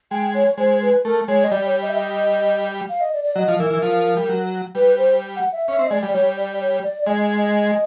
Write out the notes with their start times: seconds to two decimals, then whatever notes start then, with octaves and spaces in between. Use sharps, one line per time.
0.11 G#3 G5
0.34 C#5
0.58 G#3 C5
0.82 B4
1.05 A3 A#4
1.28 G#3 C#5
1.44 D#5
1.51 G3 D5
1.66 C#5
1.82 D#5
1.89 E5
1.96 D#5
2.89 F5
3.01 D#5
3.14 D5
3.24 D5
3.36 F#3 D#5
3.48 F3
3.59 E3 A#4
3.70 E3
3.82 F3
4.17 G3
4.29 F#3
4.75 G3 B4
4.98 C5
5.36 F#5
5.52 E5
5.68 C#4 E5
5.79 C4
5.85 D#5
5.91 G#3 D5
6.03 G3
6.13 G3 C#5
6.37 D5
6.61 C#5
6.83 D5
7.02 D5
7.07 G#3 D#5
7.38 D#5